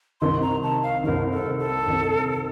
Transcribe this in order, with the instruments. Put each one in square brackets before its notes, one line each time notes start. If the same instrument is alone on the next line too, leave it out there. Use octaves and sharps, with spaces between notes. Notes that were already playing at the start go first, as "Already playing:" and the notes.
[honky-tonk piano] C2 C3 D#3 [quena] C6
[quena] A#5
A5
F5
[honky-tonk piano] C2 C3 D#3 [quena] A#4
[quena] A4
A4
[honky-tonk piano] C2 C3 D#3